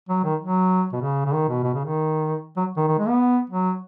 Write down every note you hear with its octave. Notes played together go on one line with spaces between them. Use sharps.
F#3
D#3
F#3
B2
C#3
C#3
D#3
B2
B2
C#3
D#3
F#3
D#3
D#3
G#3
B3
F#3